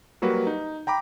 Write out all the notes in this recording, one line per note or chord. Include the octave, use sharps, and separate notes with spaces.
F#3 G3 A#3 F#4 B4
D#4
G5 A#5 B5 D6